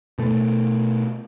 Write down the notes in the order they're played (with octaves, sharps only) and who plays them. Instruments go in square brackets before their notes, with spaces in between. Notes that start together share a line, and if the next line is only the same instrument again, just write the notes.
[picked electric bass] B2 A3